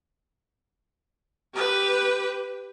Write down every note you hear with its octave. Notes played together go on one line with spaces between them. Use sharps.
G4 B4